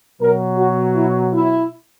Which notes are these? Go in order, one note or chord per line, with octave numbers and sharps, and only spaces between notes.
B2 F#3 A#4
F#4
E4
E4